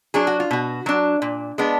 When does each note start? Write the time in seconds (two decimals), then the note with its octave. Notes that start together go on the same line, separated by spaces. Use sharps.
0.14 F#3 D4 G#4
0.27 F#4
0.40 F4
0.51 B2 F#4
0.86 F#3 D4
1.22 A#2
1.58 G#3 B3 D4